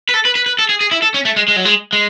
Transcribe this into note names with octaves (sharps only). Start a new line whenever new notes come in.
B4
A4
B4
B4
B4
A4
G#4
G#4
E4
A4
C#4
A3
G#3
G#3
F#3
G#3
G#3